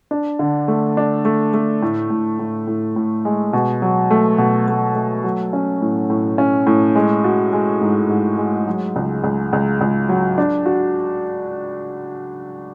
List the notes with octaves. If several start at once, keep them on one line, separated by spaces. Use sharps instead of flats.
D4
D3
A3
D4
A3
A3
A2
A2
A2
A2
A2
G#3
B2
F#3
A3
B2
A3
A3
F#3
C#4
A2
A2
C#4
A2
G#3
F#4
G#3
G#2
G#2
G#3
F#3
C#2
C#2
C#2
C#2
F#3
D4
F#4